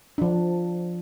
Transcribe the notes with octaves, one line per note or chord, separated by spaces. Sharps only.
F3 D4